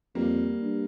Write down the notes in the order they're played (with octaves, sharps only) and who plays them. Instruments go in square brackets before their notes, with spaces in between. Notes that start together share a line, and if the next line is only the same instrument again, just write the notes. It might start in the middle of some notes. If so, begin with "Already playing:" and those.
[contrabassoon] F2 [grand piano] G3 A#3
[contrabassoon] G2